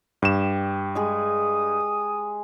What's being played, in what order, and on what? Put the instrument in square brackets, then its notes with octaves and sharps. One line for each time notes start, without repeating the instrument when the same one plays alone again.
[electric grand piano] G2 E7 [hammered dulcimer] G4
[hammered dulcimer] G#3 G#4 [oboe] D#6